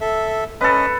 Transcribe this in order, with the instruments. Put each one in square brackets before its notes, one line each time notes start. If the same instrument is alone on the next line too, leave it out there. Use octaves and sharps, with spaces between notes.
[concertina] A4 E5
[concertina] C#4 D#5 [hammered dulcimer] A4 B4